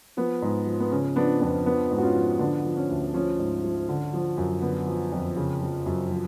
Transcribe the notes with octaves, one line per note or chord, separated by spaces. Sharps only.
F3 B3
G#2
F3
B3
C#3 C#4
F3 B3 D4
F2 B3 D4
F3 B3 D4
G#2
F#4
C#4 F4
F3
D3 B3 D4
F3
C#4
D2
F3 C#4
G#2
F3
D3
F3
F#2
D3 B3
F3
F2
C#3
F3
F#2
F3